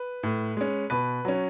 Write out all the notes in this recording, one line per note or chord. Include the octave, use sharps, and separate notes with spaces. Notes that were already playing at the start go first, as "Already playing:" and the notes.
Already playing: B4
A2
G#3 C#4
B2 B4
F#3 C#4